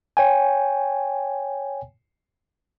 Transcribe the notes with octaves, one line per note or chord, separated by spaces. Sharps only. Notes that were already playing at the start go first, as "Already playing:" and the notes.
C#5 G5 G#5